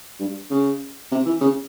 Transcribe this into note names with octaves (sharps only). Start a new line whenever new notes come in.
G2
C#3
C3
E3
C#3